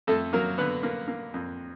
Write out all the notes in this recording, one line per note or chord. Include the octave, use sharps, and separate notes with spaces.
F2 A3 A4
F#3 A#3 A#4
D3 B3 B4
A#3
A#3
F2